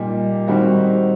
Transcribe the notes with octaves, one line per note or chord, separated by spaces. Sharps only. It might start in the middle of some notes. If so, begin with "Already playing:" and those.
Already playing: A#2 G3 A#3 D#4
D#3 G3 C4 D#4 F#4